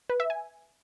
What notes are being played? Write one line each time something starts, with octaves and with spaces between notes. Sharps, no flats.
B4
E5
G#5